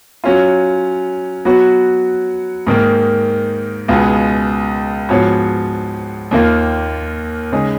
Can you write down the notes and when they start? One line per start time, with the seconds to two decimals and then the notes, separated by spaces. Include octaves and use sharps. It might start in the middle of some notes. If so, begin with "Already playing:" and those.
0.24 F#3 C#4 F4
1.45 F#3 B3 F#4
2.67 G#2 D#3 A#3
3.88 C#2 B2 G#3 B3 F4
5.09 G#2 F3 B3 F#4 C#5
6.31 D#2 D#3 A#3 F4
7.52 C#3 G#3 D#4